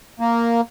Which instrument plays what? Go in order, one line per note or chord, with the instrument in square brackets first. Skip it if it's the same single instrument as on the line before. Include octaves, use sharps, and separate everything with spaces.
[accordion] A#3